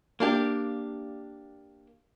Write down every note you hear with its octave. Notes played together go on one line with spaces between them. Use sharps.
A#3 D4 G4